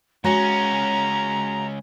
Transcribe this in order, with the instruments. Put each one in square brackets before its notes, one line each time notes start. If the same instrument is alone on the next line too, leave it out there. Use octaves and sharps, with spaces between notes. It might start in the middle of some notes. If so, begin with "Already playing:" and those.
[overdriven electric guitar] C#2 C#4 [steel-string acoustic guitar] G#3 F#4 C#5 [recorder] A#5